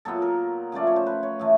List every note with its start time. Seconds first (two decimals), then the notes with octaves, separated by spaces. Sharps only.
0.05 A#2 F#3 B3 A4
0.22 A#4
0.72 C#3 F3 A3 D5
0.87 C#5
0.96 C5
1.06 B4
1.23 C#5
1.39 A2 E3 A3